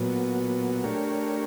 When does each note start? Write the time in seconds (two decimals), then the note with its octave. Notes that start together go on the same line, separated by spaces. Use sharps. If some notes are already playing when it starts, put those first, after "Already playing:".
Already playing: A#2 F#3 B3
0.84 A3 D4 G4 A#4 C#5